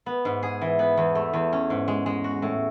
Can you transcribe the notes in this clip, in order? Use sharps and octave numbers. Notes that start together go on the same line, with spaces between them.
B3
G#2
G#4
E3
B3
E2
A3
E2
C#4
G#2
G#3
G#3
F#4
A2